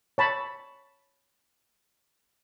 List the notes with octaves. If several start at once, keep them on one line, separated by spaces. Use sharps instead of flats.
C#5 A5 B5